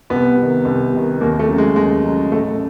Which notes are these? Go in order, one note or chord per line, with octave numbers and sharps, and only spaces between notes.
C2 B3
C3
D#3
C2
C3 D#3
D#2 A#3
A3
C#3 F#3
G#3
D#2 G#3
C#3 F#3
A1 A3